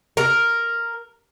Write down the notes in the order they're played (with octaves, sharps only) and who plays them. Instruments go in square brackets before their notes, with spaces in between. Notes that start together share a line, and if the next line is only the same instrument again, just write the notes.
[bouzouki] A#4